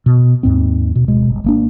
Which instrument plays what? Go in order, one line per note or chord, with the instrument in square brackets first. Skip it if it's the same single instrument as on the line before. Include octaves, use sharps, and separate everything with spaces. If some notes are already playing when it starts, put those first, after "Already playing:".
[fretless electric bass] B2
D#2 G#2 C4
B2
D1 B2 G#3
G1
G#1 A#3 D4